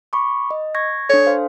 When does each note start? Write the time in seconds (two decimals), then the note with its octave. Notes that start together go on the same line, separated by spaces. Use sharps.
0.13 B5 C#6 D6
0.51 D#5
0.75 C#6 G#6 A#6
1.10 D4 A4 C#5
1.27 C5 F5